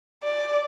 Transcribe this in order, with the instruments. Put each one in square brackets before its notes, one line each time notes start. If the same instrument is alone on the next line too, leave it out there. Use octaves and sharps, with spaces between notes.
[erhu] D5